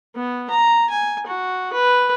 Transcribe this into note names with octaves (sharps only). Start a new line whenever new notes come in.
B3
A#5
G#5
F#4
B4